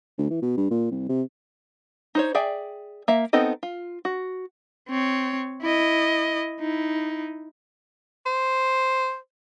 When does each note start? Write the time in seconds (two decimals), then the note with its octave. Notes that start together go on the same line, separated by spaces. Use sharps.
0.18 D2
0.31 E3
0.42 B2
0.57 G2
0.71 A#2
0.91 C2
1.09 C3
2.15 D#4 C5 C#5
2.35 G#4 D5 E5 G5
3.08 A#3 E5
3.33 B3 C4 D#4 A4 D#5
3.63 F4
4.05 F#4
4.88 C4 C#5
5.62 E4 D#5
6.60 D#4 E4
8.26 C5